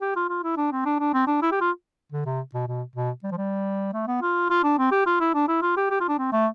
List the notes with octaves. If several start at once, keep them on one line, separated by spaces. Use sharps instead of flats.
G4
F4
F4
E4
D4
C4
D4
D4
C4
D4
E4
G4
F4
D3
C3
B2
B2
B2
G3
F3
G3
A3
B3
F4
F4
D4
C4
G4
F4
E4
D4
E4
F4
G4
G4
F4
D4
C4
A3